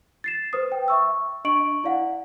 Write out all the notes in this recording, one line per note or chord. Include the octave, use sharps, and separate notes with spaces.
A6 C7 E7
B4 C5 D#6
G5
E5 C#6 E6
D4 D#5 C#6 D7 F#7
E4 D5 F5 F#5